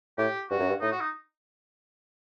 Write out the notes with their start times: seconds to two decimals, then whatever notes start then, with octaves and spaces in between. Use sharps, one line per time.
0.18 A2 G4
0.50 G2 F#4
0.59 F#2
0.69 G2
0.81 A2 D#4
0.91 F#4
1.00 D#4